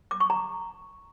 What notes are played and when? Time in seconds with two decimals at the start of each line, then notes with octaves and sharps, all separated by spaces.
0.11 D6
0.20 C#6
0.30 A#5